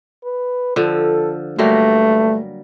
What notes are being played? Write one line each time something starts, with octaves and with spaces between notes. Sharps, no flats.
B4
D3 F3 A4
G2 F#3 G3 A3 A#3